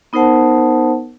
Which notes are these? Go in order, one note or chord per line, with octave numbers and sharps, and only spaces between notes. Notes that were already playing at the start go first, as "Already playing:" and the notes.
B3 D#4 A#4 C5 F#5 A5